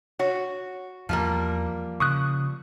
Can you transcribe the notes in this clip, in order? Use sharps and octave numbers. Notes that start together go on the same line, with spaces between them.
F#4 C#5
E2 F3 G3 A#3
C#3 C#6 D#6 F#6